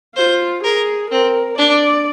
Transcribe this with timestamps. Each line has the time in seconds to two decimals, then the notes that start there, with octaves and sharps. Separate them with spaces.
0.16 F4 C5
0.63 G#4 A#4
1.11 C4 A#4
1.58 D4 D5